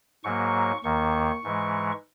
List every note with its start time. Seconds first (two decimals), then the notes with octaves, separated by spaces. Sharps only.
0.24 G#2 F#3 A#3 C#6
0.83 D#2 D#3 A#3 C#6
1.44 G#2 E3 G#3